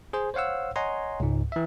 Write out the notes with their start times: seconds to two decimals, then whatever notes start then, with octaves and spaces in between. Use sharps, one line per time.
0.13 G#4 C5 G#5
0.34 C5 C#5 F5 F#5 E6
0.76 C#5 D#5 F#5 G#5 A#5 C6
1.20 C#2 G#2
1.52 E3 E5